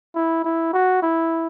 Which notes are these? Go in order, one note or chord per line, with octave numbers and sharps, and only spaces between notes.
E4
E4
F#4
E4